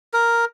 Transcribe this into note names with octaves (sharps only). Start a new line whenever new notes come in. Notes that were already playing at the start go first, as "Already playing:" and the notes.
A#4